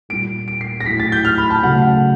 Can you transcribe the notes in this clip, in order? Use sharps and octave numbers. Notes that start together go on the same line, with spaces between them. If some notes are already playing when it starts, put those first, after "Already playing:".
A#2 G3 A#3 D7
D7
C7
A#6
A2 F#3 A3 B6
A6
G6
F6
B5
A5
C#3 F#3 A3 F#5
F#5